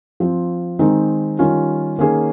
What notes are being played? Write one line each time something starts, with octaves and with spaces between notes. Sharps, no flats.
F3 C4 F4
D#3 G#3 C4 D#4 A#4
D#3 G3 C#4 F4
D#3 A#3 C#4 G#4 C#5